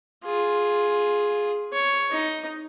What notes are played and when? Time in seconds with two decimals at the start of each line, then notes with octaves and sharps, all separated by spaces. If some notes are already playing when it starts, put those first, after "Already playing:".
0.25 F4 G#4
1.73 C#5
2.11 D#4